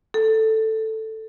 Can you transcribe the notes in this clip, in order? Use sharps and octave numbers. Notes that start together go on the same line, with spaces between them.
A4